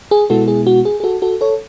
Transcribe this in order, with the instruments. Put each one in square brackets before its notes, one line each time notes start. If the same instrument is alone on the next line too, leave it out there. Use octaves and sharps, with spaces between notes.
[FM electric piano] G#4
B2 G#3 B3 E4 F#4 A4
G#4
F#4
G#4
G#4
F#4 A4
F#4 A4
A4 C#5